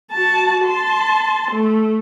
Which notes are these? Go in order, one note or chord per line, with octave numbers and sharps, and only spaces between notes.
F#4 A5
A5 C6
A3